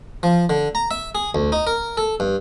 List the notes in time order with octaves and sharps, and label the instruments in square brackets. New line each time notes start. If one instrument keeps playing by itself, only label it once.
[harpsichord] F3
D3
A#5
E5
G#4
D2
D#4
A#4
A4
G2